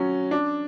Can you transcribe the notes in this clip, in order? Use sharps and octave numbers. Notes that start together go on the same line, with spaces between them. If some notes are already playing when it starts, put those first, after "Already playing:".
Already playing: F#3 C#4
D4